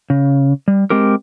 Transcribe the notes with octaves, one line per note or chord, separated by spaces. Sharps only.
C#3
G3
G#3 C4 G4 A#4